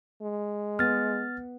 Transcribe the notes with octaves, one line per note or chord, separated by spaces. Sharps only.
G#3
B3 F6 A6